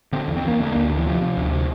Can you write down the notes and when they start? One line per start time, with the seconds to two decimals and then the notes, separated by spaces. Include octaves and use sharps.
0.12 D3 C4
0.28 E2
0.37 C4
0.44 E2 A#3
0.60 D3 A3
0.72 D2 A#3
0.90 D3
0.97 E3
1.06 C3 F3
1.21 C3
1.37 D2
1.52 C3